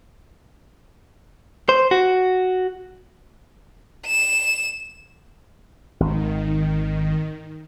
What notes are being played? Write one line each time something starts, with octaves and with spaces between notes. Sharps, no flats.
C5
F#4
E7
G#1 D#3